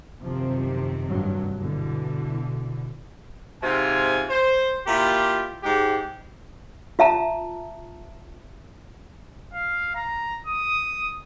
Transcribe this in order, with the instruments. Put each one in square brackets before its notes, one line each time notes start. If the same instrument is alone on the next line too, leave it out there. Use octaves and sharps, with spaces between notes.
[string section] F#2 C3 D#3 [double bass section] F3
[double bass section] F1 G2 F#3
[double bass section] B2 D3 [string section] E3
[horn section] G#2 C3 F4 G#5
C5
A#2 E4 F4 G4
G#2 G#3 G4
[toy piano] F4 E5 A5 A#5
[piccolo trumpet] F5
A#5
D#6